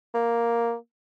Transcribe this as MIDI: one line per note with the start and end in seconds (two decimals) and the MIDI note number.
0.14 0.75 58